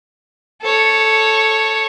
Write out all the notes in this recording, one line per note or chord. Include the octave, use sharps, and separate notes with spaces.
A4 C#5